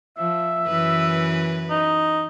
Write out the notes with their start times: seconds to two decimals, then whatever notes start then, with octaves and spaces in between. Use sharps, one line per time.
0.18 F3 E5
0.67 F#2 E3 B4
1.70 D#4